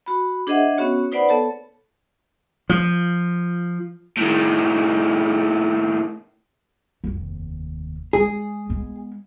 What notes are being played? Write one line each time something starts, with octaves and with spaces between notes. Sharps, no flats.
F#4 B5
D4 G#4 C5 D#5 E5 F#5
B3 C#4 F#4 C#5
D#4 B4 C5 D5 F#5 B5
B3 A4 C#5 A5
F3
A2 D#3
F1 D#2
G#3 G#4
G#3 B3